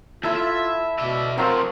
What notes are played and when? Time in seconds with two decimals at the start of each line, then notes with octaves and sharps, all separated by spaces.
0.23 D#2 E4 F4 A4 E5
0.36 E5
0.99 B2 D5 E5
1.38 C3 F3 F#3 C4 F4 A#4